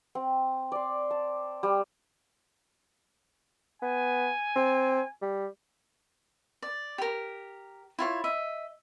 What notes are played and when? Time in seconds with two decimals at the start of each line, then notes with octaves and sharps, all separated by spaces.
0.15 C4
0.72 D5 C6
1.11 A5
1.63 G3
3.82 B3 G#5
4.56 C4
5.21 G3
6.62 D5
6.98 G4 A#4
7.99 E4 F4 C#5
8.24 D#5 E5